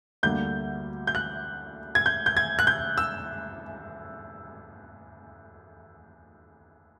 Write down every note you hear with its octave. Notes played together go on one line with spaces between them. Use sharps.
D2 D3 G3 A#3 G6
G6
F#6
G#6
G6
G6
G#6
F#6
G6
E6